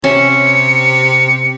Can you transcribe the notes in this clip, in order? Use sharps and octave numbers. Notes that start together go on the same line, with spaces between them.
C3 C#4 E5 C#7